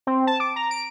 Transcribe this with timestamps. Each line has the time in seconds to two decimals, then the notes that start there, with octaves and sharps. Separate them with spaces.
0.07 C4
0.27 A5
0.40 D6
0.56 A#5
0.71 D7